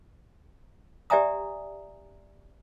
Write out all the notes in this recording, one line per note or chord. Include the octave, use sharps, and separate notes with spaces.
G4 D5 E5 G#5 A#5 D#6